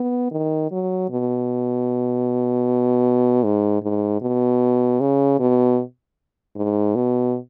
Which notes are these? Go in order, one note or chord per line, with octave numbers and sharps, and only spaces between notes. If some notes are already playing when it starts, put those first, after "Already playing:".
Already playing: B3
D#3
F#3
B2
G#2
G#2
B2
C#3
B2
G#2
B2